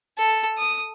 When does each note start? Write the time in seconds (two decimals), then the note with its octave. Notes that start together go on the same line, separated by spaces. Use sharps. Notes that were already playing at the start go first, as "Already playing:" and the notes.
0.18 A4
0.58 D#6